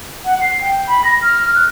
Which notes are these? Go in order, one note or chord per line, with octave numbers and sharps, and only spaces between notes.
F#5
C7
G5
B5
A#6
F6
F#6